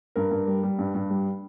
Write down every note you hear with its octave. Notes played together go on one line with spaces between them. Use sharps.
G2 A#4
G2
G3
G3
G2
G2
G3